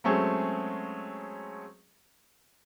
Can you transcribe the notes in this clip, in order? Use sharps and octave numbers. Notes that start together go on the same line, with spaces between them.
F#3 G#3 A3 C4 C#4 G#4